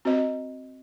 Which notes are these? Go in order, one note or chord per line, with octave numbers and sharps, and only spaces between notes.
C4 F#4 C5 D#5